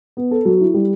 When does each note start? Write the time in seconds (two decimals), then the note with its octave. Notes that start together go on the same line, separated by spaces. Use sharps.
0.17 B3
0.31 A4
0.45 F#3
0.61 E4
0.74 G3